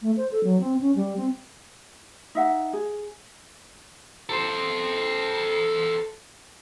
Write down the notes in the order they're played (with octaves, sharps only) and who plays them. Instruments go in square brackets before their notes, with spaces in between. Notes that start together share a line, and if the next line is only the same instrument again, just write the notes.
[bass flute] A3
C5
A4
F#3
C4
C#4
G3
C4
[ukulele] D#4 E5 F#5
G#4
[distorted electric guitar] A4 C5